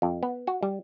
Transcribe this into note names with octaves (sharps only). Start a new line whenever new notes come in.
F2
B3
F#4
G3